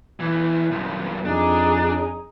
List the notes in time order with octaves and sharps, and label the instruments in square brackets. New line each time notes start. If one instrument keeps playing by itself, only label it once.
[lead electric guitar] F2 E3
C2 F#2
[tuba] F2 [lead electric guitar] D4 [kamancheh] D#4 G#4